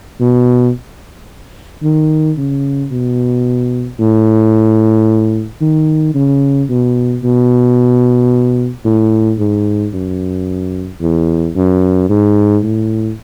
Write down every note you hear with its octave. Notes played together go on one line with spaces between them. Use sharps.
B2
D#3
C#3
B2
A2
D#3
C#3
B2
B2
A2
G#2
F#2
E2
F#2
G#2
A2